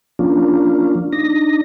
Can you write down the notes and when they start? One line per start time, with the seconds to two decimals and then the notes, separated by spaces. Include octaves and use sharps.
0.19 F3 A#3 C#4 D4 F4
1.13 D4 D#4 A#6